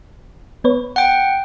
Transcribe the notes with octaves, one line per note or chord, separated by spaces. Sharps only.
B3 B4 C#5
F#5 G5